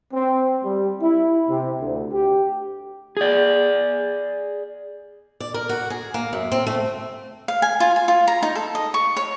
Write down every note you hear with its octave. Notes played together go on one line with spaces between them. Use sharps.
C4
G3
E4
C3
D2
G4
G#4 D5
D5
A#4
F#4
G#4
A#3
F#2
C4
A3
F5
G#5
F4
G#5
F4
A#5
D#4
A4
D#5
C#6
C#5